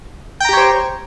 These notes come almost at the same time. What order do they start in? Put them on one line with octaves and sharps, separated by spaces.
G5 A#5 G4 C#5 C5